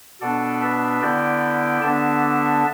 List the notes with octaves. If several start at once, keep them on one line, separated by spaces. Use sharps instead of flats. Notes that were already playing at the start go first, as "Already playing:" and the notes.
B2 B3 D4 A4 D5
B4 E5
D3 B3 E4 D5 G5
D3 B3 D4 E5 A5